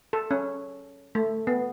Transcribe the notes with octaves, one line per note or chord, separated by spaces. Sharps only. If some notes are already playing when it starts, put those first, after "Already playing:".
A4
C#4
A3
B3